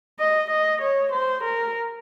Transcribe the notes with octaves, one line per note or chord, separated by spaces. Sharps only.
D#5
D#5
C#5
C5
A#4